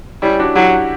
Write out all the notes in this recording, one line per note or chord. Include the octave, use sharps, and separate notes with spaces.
G3 C#4 E4
D4 F#4
F#3 E4 G4